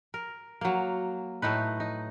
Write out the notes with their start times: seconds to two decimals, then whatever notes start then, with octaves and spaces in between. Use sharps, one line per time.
0.14 A#4
0.61 F#3 A#3
1.42 A2 A3 D#4 B4
1.80 D#4